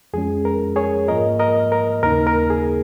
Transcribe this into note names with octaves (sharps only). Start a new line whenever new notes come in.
F2 F3 G#3 C#4 G#4
A#4
G#4 C#5
G#2 F3 A#3 F4 A#4 D#5
A#4 D#5
A#4
D#2 C#3 A#3 D#4 A#4
A#4
G#4